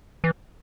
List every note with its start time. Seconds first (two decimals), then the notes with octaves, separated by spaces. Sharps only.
0.24 E3